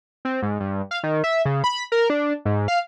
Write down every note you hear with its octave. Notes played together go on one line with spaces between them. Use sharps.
C4
G#2
G2
F5
D#3
E5
C#3
B5
A#4
D4
G#2
F5